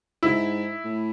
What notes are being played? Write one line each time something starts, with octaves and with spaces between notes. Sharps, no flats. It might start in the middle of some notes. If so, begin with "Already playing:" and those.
G#2 E4
A2